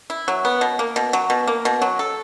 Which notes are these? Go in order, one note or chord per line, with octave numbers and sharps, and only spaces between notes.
E4
F#3
B3
B2
A#3
B2
F#3
B2
A#3
B2
F#3
A4